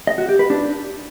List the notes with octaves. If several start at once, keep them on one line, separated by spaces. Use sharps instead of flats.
D#5
F#4
G4
B4
D4